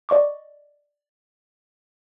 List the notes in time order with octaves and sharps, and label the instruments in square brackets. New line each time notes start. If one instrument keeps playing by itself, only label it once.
[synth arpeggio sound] D5 D#5 C#6 D6